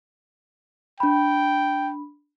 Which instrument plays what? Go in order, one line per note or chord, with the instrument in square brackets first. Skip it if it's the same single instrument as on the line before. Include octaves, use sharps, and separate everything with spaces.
[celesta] D4 B5 [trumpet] G5